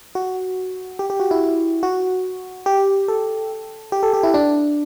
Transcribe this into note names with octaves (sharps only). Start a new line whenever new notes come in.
F#4
G4
G4
F#4
E4
F#4
G4
A4
G4
A4
G4
E4
D4